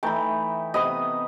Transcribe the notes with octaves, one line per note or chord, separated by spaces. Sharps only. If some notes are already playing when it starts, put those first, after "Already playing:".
E3 A3 D#4 G5 B5
C3 B3 D#5 B5 D#6